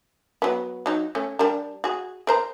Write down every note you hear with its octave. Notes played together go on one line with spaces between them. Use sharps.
F#3 B3
F#3 D#4
A3 C#4
G3 D4 A#4
F#4 G#4
A#4 C5 A#5